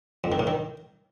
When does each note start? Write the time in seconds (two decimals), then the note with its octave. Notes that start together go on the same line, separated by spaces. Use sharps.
0.24 F2
0.32 D#3
0.39 A2
0.47 D#3